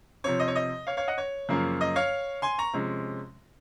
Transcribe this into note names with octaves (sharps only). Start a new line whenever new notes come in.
C3 F3 C4 C#5
D#5
C#5
D#5
C#5 F5
C#5 F5
D#5 F#5
C#5
F#2 C#3 F3 A#3 C#4
D#5
C#5 F5
G#5 C6
A#5 C#6
C3 F3 G#3 C#4